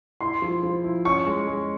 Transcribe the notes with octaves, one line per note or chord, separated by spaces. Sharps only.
E4 C6
F3
F3
E4
C#4 C#6
G#3
G#3